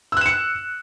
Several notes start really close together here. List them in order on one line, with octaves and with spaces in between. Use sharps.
E6 F#6 E7 C#7